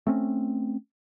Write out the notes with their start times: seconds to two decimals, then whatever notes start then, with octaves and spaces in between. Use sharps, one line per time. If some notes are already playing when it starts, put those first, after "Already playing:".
0.07 A3 C4 C#4